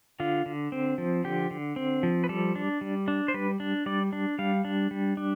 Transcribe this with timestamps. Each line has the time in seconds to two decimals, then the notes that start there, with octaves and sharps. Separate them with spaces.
0.20 D3 F4
0.46 D3
0.72 C4
0.98 F3
1.24 D3 G4
1.51 D3
1.76 C4
2.03 F3
2.24 B4
2.29 G3 A4
2.55 D4
2.81 G3
3.08 D4
3.28 C5
3.34 G3 B4
3.60 D4
3.86 G3 D5
4.13 D4
4.39 G3 F5
4.65 D4
4.91 G3
5.17 D4